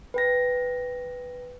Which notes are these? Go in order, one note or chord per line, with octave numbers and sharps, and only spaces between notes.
B4 G5 A#6